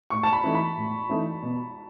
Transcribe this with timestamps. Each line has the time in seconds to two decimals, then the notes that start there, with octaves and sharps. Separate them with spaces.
0.10 A2 C#6
0.23 A5
0.33 B5
0.44 E3 A3 D#4
0.55 B5
0.77 A2
1.09 E3 A3 D#4
1.43 B2